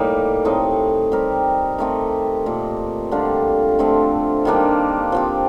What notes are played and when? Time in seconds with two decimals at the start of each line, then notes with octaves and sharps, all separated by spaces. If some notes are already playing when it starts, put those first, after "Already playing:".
Already playing: A2 G3 A#3 D#4
0.45 A2 A3 C4 D#4
1.12 G3 C4 G4 A#4
1.78 D#3 A3 C4 G4
2.46 A#2 A3 D#4
3.11 D3 G3 D4 F4
3.79 D3 F3 A3 C4
4.45 D#3 G3 A#3 D4
5.12 F3 C4 G4